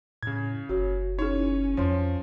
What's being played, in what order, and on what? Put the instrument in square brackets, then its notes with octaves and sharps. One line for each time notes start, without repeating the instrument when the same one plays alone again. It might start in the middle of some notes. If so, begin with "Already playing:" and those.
[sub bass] A2 [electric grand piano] C#3 G#6
[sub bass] F#1 [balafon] F#4 C#5
[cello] C#4 [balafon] D#4 E4 G#4 [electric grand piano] C#5
[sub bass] F2 [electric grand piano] F3 [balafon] C#5 C6